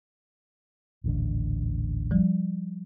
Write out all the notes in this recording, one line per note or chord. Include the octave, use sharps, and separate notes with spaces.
D#1 A1 D3
F3 G3